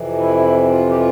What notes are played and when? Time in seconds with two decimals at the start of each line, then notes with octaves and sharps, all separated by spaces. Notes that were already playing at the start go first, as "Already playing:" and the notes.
Already playing: F2 C3 E3
0.18 E4
0.70 F4
0.89 G4
0.96 F4